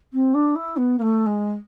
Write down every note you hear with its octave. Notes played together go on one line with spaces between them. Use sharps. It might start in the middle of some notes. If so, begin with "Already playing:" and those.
C4
D4
E4
B3
A#3
A3
G#3